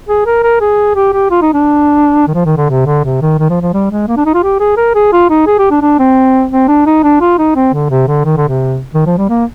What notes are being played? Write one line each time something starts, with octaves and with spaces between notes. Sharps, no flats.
G#4
A#4
A#4
G#4
G4
G4
F4
D#4
D4
D#3
F3
D#3
D3
C3
D3
C3
D#3
D#3
F3
F3
G3
G#3
A#3
D4
D#4
F4
G4
G#4
A#4
G#4
F4
D#4
G#4
G4
D4
D4
C4
C4
D4
D#4
D4
F4
D#4
C4
D3
C3
D3
D#3
D3
C3
D#3
F3
G3
A#3